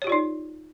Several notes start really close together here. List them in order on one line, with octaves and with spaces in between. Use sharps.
C#5 G4 F4 D5 D#4